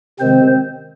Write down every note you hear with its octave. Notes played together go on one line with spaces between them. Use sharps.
C3 D#3 G#3 C4 C5